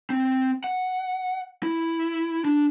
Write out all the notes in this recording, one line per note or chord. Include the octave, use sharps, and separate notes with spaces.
C4
F#5
E4
D4